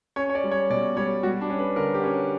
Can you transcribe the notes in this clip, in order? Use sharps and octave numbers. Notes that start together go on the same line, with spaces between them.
C#4 C#5
C#5
D5
G3
C#5
B2 D5
G3 C#5
G3 F#4
D4
C#4
B4
D3 A#4
G4
C#4